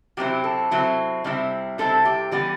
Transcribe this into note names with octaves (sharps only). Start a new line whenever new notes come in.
C3 F#3 C4 E4 G4
A4
C3 F#3 C4 E4
C3 G3 C4 E4
C3 G3 C4 E4 A4
G4
E3 G3 B3 G4